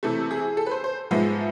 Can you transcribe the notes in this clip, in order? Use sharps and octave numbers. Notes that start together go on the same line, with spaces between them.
C3 E3 A3 A4
G#4
A4
B4
C5
C5
G#2 F3 G#3 B3 E5